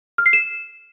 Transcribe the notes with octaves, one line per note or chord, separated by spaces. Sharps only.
F6
C7
E7